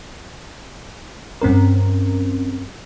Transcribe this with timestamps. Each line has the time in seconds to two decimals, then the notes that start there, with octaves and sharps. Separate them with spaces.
1.42 G2 C4 C#4 A#4